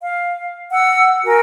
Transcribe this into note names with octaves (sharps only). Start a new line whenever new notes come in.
F5
F#5 E6
F#4 A#4 G#5